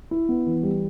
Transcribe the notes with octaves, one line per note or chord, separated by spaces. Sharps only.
E4
B3
E3
G3